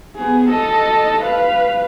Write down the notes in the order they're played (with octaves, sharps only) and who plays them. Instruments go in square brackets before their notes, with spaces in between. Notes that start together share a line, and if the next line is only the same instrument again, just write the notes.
[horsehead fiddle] B3 G#4
A4 D#5
B4 F5